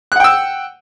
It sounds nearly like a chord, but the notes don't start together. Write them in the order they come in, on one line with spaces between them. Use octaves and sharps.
F#6 F#5 G5 E6